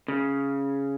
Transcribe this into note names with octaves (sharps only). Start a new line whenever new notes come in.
C#3